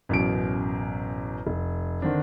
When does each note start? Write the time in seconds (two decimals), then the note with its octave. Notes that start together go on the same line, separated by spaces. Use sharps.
0.09 A1 F#2 B2 D7
1.47 F1
2.02 D3 D#3 C4 D4